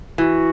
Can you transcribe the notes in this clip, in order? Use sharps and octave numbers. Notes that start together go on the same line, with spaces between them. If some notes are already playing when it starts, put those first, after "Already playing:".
E3 F#4